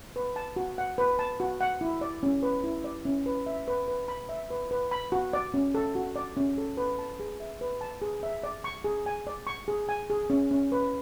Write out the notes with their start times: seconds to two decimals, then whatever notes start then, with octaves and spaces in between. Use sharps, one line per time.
0.16 B4
0.36 A5
0.56 F#4
0.78 F#5
0.98 B4
1.19 A5
1.40 F#4
1.61 F#5
1.81 E4
2.01 D5
2.23 C#4
2.43 B4
2.64 E4
2.84 D5
3.05 C#4
3.26 B4
3.46 E5
3.68 B4
3.88 B4
4.08 B5
4.29 E5
4.50 B4
4.71 B4
4.91 B5
5.12 F#4
5.33 D5
5.54 C#4
5.75 A4
5.95 F#4
6.16 D5
6.37 C#4
6.58 A4
6.77 B4
6.99 A5
7.20 G#4
7.40 E5
7.61 B4
7.81 A5
8.02 G#4
8.23 E5
8.43 D5
8.64 C#6
8.84 G#4
9.06 G#5
9.27 D5
9.47 C#6
9.68 G#4
9.89 G#5
10.10 G#4
10.30 C#4
10.51 C#4
10.72 B4